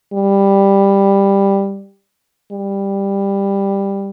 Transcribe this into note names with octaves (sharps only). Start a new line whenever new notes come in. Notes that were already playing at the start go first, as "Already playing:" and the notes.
G3
G3